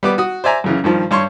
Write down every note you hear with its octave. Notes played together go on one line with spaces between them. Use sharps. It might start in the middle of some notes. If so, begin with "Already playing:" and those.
G3 B3 D6
F#4 D#6
C5 D5 E5 G#5 A#5
F#2 C#3 E3
G2 D#3 F3
G2 C#5 C6 C#6